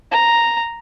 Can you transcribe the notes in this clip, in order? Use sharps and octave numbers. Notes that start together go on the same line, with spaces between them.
A#5